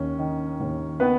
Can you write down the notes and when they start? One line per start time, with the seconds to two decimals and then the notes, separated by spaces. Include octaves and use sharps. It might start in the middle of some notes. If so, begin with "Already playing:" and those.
Already playing: D#2 D#3 C#4
0.19 D#3
0.60 D#2
1.00 D#3 B3 B4